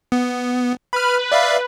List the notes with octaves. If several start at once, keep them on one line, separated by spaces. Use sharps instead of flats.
B3
B4 B5 F6
D5 E5 F5